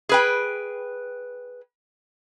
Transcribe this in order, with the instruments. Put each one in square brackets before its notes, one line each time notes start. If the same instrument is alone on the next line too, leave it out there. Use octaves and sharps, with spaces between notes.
[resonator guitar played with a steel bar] G#4 B4 G5